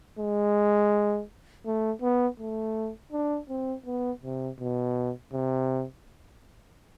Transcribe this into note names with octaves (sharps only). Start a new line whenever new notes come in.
G#3
A3
B3
A3
D4
C4
B3
C3
B2
C3